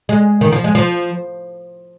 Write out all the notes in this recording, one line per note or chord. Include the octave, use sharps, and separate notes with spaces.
G#3
D#3
F3
G#3
F3